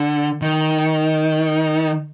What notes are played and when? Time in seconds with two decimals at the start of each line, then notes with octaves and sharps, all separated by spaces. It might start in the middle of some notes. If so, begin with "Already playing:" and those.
Already playing: D3
0.42 D#3